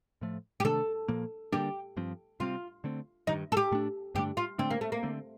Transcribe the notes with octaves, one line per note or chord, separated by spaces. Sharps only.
A2 F3 A3
G4
C3 D#3 A3 D4 A4
A#2 F3 A#3
D3 G3 A#3 D4 G4
G2 F3 C4
C3 G3 C4 F4
D3 A3 C4
G2 D#3 G3 D#4
A4
G4
A2 A3 D4
G2 D3 A3 D4 G4
F4
D3 A3 C4 D4
A#3
A3
A#3
D3 A3 C4